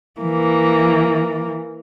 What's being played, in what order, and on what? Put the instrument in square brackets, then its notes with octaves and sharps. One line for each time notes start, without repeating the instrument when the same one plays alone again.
[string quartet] E3 A#3